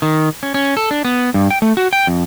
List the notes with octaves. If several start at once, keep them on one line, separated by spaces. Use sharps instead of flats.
D#3
C#4
C#4
A4
D4
B3
G2
G5
A3
F#4
G5
F2